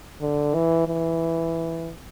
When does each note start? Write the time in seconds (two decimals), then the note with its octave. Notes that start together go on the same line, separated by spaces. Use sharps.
0.21 D3
0.54 E3
0.88 E3